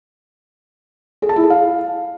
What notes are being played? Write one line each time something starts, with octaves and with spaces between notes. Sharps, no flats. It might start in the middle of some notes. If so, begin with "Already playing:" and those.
G#4
A5
E4
G#4
F5